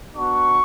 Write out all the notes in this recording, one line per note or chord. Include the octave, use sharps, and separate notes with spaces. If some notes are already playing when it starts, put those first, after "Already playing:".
B3 D4 F#4 C#6